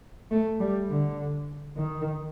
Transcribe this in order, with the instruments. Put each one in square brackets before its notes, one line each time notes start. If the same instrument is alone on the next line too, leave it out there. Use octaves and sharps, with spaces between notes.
[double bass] A3
G3
D3
D#3